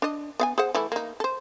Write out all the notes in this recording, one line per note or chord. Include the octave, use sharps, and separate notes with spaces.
D4 D#5
B3 F5 G#5
G#4 C5 F#5
E3 A3 E4
A#3 D#4
A4 C5